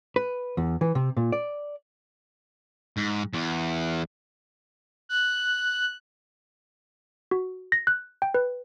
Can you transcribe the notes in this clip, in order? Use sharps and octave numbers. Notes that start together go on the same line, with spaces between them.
B4
E2
E3
C3
A#2
D5
G#2
E2
F#6
F#4
A#6
F#6
G5
B4